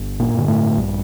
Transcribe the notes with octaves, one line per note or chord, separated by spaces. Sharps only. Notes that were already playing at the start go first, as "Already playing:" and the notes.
Already playing: G1
A#2 A#3
G2 D3
A2 A3
A#1 G2 G3